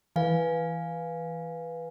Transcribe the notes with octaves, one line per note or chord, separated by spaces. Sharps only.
E3 B4 F5 G#5